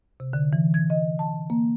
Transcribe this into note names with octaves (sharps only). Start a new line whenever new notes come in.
C3
D3
E3
G#6
D#5
A5
A#3